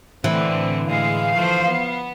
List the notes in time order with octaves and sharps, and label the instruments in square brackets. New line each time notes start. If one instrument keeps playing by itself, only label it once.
[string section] A2 D3 C4 [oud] E3
[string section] A2 G#3 [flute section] F5
[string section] F3 A3 C5
B3